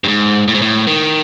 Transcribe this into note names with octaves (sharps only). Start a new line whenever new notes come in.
G2
G#2
A2
G#2
A2
D#3